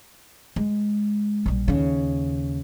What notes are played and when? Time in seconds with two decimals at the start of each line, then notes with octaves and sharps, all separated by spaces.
0.56 G#3
1.46 A#1 G3
1.68 D#2 C#3